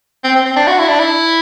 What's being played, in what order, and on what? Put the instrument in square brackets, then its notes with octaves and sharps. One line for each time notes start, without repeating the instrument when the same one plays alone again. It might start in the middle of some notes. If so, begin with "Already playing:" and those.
[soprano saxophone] C4
C4
C4
D4
F#4
E4
D4
E4